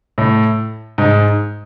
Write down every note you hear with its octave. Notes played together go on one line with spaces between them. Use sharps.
A2
G#2